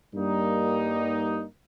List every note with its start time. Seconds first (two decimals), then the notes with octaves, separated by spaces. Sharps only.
0.14 G2 G3 A#3 D#4